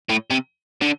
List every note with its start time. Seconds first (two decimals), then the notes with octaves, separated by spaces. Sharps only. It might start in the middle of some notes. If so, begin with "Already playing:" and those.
0.10 A2
0.31 C3
0.82 D3